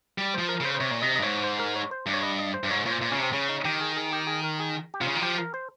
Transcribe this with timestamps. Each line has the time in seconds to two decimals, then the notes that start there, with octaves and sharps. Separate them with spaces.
0.18 G3
0.34 F3 C5
0.49 A#4
0.60 C#3 C5
0.75 C5
0.80 C3 C#5
0.91 A#2
1.02 C3 D#5
1.16 D#5
1.19 G2
1.22 G#2 C#5
1.44 C5
1.60 A#4
1.76 C#5
1.91 C5
2.06 G2
2.14 C#5
2.22 D#5
2.39 D#5
2.54 C5
2.64 G2
2.71 G#2 C#5
2.86 A#2 C#5
2.91 C5
3.02 A#2
3.11 C#3 C#4
3.18 C3
3.23 C4
3.33 C#3 C#4
3.49 D#4
3.65 D#3 G4
3.81 G#4
3.96 G#4
4.12 G4
4.27 G#4
4.43 A#4
4.60 G#4
4.94 G4
5.01 C3 F4
5.08 C#3
5.15 D#3
5.22 F3 G4
5.38 A#4
5.54 C5